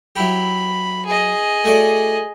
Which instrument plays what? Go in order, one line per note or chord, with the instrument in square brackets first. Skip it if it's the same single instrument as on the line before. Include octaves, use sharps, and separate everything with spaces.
[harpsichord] F#3 E4 G4 [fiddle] B5
[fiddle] G#4 D#5
[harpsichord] A3 F#4 D5